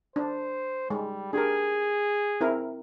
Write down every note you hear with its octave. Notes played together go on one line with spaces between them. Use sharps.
D4 C5
G3 G#3
D4 G4 G#4 A#4
C4 E4 A#4